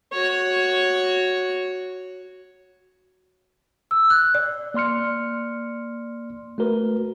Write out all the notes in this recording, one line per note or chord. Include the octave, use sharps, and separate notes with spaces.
F#4 C#5
E6
F#6
D5
A#3 D5 C6 F6 C#7
A3 F#4 A#4 B4